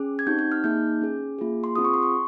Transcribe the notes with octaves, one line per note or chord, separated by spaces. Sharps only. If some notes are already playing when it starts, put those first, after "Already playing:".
Already playing: C#4 G#4
G#6
C4 D#4 G4 G6
G6
F6
A#3 D#4 G#4 G6
C#4 G#4
A#3 F4 G#4
C6
C4 F4 G#4 D#6
C#6
C6
C#6